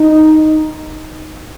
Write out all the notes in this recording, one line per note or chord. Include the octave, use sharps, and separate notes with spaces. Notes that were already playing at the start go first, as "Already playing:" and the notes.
Already playing: D#4